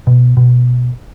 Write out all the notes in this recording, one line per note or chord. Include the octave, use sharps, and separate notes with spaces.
B2
B2